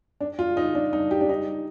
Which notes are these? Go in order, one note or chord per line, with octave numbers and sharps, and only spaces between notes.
D4
F4
D#4
D4
D#4
G4
D4
D#4